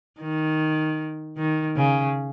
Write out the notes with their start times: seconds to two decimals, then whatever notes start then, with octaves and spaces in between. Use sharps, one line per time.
0.20 D#3
1.37 D#3
1.77 C#3